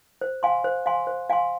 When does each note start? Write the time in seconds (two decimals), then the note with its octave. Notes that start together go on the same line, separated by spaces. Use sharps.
0.21 C5
0.43 F5 G#5 C6
0.64 C5
0.86 F5 G#5 C6
1.07 C5
1.30 F5 G#5 C6